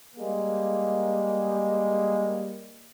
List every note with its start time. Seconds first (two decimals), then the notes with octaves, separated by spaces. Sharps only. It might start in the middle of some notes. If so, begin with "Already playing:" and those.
0.16 G3 G#3 A#3